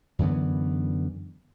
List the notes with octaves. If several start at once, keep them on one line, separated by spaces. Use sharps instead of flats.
F#2 D3 E3 B3